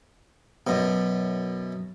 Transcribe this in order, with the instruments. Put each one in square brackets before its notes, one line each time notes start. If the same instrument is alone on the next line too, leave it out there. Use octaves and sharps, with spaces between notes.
[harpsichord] F#2 B2